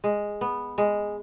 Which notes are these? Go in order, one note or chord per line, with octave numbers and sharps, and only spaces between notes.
G#3
B3
G#3